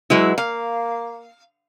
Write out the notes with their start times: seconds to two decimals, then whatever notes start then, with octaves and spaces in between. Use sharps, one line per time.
0.10 B2 F#3 G#3 E4
0.38 A#3 F5